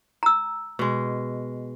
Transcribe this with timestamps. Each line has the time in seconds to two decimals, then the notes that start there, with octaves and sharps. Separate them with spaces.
0.23 A#5 E6
0.79 B2 G#3